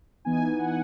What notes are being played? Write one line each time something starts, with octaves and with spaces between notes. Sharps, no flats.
E3 B3 D#4 G#5
F#5